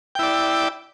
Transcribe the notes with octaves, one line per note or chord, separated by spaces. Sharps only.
E4 D5 G5